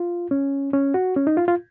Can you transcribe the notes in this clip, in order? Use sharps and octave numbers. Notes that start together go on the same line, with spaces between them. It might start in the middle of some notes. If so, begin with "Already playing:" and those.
Already playing: F4
C#4
C#4
F#4
C#4
D#4
F4
F4